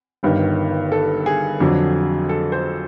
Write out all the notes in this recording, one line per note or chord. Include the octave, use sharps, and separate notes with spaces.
G1 G2 D#3
A4
G#4
F2 D3 F#3
A4
C5